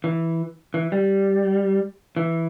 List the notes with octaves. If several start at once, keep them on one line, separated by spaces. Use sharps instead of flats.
E3
E3
G3
E3